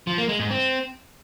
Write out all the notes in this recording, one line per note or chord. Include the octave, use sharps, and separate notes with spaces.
F3
A#3
G#3
G#2
C4